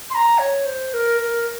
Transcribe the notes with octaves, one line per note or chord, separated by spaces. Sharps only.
C6
A#5
C#5
C5
A#4
A#4